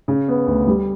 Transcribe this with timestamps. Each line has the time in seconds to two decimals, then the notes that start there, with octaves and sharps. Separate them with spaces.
0.08 C#3
0.28 B3
0.47 D2
0.67 G3